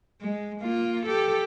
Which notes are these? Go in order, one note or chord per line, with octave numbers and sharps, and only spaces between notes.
G#3
A#3 F4
G4 A4